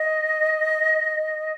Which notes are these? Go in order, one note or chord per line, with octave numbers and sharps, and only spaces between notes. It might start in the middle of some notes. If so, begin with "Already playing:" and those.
Already playing: D#5